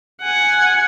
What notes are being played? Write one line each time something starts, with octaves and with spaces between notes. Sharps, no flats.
F#5 G#5